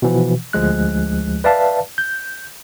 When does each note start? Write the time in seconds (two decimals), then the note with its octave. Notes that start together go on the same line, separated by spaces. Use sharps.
0.02 B2 E3 F3
0.53 D2 F3 G#3 F#6
1.44 B4 D5 E5 F5 A5
1.98 G6